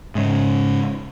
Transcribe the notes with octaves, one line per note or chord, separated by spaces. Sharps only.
G#2 C#3